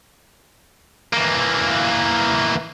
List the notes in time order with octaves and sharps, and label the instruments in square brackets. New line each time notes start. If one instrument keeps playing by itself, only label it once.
[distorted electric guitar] E3 A#3